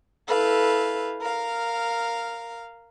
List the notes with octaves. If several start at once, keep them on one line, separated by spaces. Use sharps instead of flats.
E4 A4 B4 F5
A#4 F5